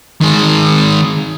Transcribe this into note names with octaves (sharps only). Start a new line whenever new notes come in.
D#3 G#3